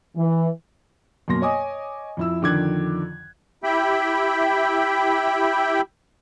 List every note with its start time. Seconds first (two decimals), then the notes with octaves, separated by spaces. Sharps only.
0.16 E3
1.28 F#2 B2 A#3 C6 A#6
1.41 C#5 D#5 G#5 D6 D#6
2.17 F2 E4 E6
2.42 F2 D3 D#3 D6 F#6 G#6
3.64 E4 G4 E5 G5 B5